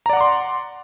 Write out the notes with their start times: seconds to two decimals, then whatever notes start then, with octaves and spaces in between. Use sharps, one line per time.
0.06 A#5
0.09 D5
0.13 F#5
0.17 D6
0.21 C6